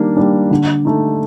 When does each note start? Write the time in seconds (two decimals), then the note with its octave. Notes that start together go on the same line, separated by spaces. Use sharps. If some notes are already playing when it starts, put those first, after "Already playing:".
Already playing: D#3 G3 A#3 D4
0.17 G3 A#3 D4
0.51 D3
0.85 A3 D#4